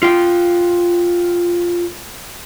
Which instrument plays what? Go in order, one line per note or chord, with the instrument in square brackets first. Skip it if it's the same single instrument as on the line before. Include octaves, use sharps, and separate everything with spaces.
[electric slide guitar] F4 G5